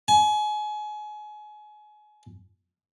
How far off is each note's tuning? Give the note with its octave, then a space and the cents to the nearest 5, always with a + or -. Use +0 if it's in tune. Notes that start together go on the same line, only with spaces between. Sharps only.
G#5 +30